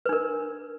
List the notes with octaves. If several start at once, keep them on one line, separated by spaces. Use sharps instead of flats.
D4 A#4 B4